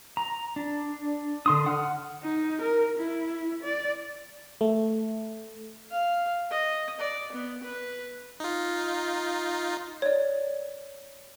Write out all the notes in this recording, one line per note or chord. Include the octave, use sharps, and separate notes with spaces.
A#5
D4
D3 C6 D#6
F#5 F6
D#4
A#4
E4
D5
A3
F5
D#5
D5
B3
B4
D#4 F4
C#5 D5